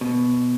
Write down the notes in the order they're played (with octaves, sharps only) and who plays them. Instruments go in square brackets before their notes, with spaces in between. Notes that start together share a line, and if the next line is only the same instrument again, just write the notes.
[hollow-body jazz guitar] B2